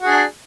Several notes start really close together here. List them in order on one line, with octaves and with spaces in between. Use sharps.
F#4 G#4 D4